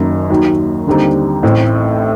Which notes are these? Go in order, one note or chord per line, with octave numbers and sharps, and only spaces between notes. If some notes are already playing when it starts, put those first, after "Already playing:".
Already playing: F#1 F#2 D#3 F#3
D#2 D#3 F#3
D#2 D3 G3 C4 D#4
A1 A2 A3 C4